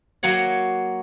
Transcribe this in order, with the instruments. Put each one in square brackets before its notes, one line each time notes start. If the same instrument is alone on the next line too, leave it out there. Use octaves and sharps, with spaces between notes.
[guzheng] F#3 A#3 F#4 C#5